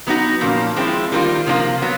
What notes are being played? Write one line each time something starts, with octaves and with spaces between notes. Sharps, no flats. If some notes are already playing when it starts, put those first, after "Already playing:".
F#3 B3 D#4 F#4
A#2 F3 A#3 C#4
F3 G#3 C4 E4
D#3 G3 A#3 D4 F4
C3 F3 A#3 D4 F4
F#3 B3